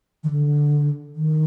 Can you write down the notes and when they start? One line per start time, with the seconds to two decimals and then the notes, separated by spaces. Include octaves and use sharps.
0.24 D#3
0.30 D3
1.15 D#3